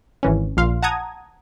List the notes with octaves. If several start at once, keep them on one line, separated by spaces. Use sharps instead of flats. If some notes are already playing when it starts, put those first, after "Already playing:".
G#1 E3 C#4
A#1 A#2 F5 C6
F#5 A5 A#5 D#6 G#6